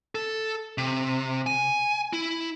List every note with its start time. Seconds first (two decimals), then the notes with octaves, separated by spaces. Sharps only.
0.15 A4
0.78 C3
1.47 G#5
2.13 E4